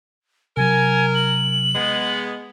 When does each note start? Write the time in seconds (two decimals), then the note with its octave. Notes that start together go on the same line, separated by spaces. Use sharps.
0.57 C3 F#3 A#4 G#5
1.15 F#7
1.75 G#3 B3